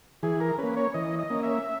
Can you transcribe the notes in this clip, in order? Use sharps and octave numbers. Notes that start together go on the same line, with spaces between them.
E3 G#4
A#4
A#3 C#4 B4
C#5
E3 D#5
D#5
A#3 C#4
E5